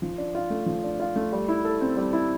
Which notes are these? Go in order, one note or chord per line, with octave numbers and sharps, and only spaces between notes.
F3
D4
F4
A3
F3
D4
F4
A3
G3
E4
A4
C4
G3
E4